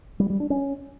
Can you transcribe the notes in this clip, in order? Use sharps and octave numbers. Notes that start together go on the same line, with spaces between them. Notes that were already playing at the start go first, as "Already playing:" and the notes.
G3
G3
D4
C#4